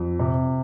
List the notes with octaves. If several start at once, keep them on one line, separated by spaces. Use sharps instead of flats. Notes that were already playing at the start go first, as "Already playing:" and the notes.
Already playing: F2
C3